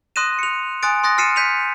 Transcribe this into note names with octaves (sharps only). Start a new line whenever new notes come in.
C6 D#6 F#6 A#6 D#7 E7
C#7 F7
G#5 C6 D#6 F#6 A6 D7
C6 D#6 F#6 A6 A#6
F6 A6 C7 C#7 D#7 E7
G6 B6 C#7 D#7 F7